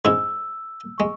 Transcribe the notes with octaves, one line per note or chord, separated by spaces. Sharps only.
G#2 G#3 C#4 E4 E6
G#3 C#6